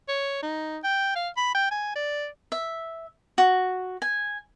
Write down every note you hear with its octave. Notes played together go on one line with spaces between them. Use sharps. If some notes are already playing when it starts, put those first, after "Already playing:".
C#5
D#4
G5
F5
B5
G5
G#5
D5
E5
F#4
G#5